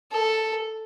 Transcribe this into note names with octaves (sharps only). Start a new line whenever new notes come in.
A4